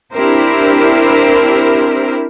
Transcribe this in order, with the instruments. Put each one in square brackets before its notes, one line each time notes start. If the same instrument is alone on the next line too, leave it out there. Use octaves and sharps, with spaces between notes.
[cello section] C4 D4 E4 G4 A#4 C5